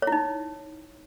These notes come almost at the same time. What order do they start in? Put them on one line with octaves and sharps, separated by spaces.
C#5 E4 D#4